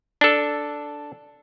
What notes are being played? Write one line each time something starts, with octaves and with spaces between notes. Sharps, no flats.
D4 A4